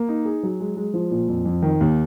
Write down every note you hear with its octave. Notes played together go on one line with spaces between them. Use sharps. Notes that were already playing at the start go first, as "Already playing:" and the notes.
Already playing: A#3
D#4
G#4
F#3
G#3
G#3
F3
A#2
F2
F2
D#3
D#2